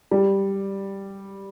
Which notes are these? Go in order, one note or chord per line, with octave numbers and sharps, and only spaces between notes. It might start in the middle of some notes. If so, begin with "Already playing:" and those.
G3